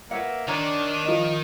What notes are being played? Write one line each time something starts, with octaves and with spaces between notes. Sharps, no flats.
A#3 B4 C#5 E5 F#5
D#3 D4 C#5 D5 A#5
F3 D#5